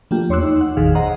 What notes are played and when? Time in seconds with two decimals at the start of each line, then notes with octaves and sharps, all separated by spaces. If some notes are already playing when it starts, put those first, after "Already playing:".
0.11 F3 A3 A#3 D4 F4 G4
0.29 E2 C#5 C6 D6 E6 F#6
0.42 D#4
0.61 F#5
0.77 G#1 E2 A#2 D#3 G#4 F5
0.95 C5 D#5 F#5 A#5